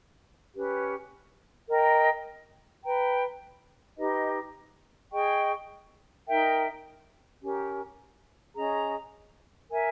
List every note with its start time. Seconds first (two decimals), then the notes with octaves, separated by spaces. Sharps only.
0.55 C#4 G4 B4
1.69 A#4 D#5 G5
2.84 B4 G5 A#5
3.98 D#4 G4 B4 D#5
5.12 G#4 D#5 G5 C#6
6.27 D#4 A#4 E5 G5
7.41 C#4 G4 A#4
8.56 C#4 G#4 D#5 A#5
9.69 A#4 E5 G#5